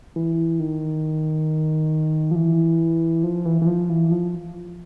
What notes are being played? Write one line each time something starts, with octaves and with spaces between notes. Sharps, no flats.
E3
D#3
F3
E3
F3
E3
E3
F3
E3
F3